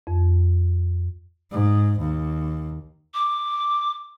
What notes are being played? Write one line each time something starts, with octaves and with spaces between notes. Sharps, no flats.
F2
G#2
D#2
D6